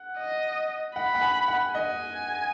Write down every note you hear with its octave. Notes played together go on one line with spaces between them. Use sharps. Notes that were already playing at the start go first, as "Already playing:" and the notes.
Already playing: F#5
D#5
F#5 B5
F#5
G#5
F#5
D#5 G#5